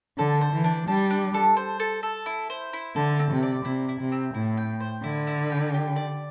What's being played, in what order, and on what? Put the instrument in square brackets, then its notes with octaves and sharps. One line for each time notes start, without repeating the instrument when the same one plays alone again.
[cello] D3 [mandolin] A4
[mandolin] C5
[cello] E3
[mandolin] D4
[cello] G3 [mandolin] D4
[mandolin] D4
A4
C5
A4
A4
E4
C5
E4
[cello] D3 [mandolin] A4
[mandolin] C4
[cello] C3
[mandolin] D5
[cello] C3 [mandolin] E4
[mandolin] E4
[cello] C3
[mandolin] C4
[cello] A2 [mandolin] E4
[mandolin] G5
C5
[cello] D3 [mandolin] E4
[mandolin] E4
G5
G4
D5